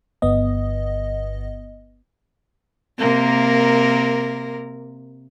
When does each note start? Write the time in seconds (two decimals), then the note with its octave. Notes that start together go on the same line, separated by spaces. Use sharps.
0.22 G1 B3 D#5
2.98 C3 A#3 A#4